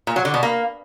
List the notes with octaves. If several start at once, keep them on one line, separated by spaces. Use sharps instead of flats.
A#2
F#3
D3
B2
A#3